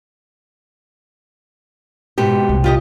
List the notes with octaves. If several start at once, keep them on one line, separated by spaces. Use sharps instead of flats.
G#2 B2 G4
C2
F4 G4 D#5